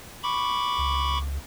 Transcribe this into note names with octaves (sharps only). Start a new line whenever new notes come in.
B5 C#6 D6
C#2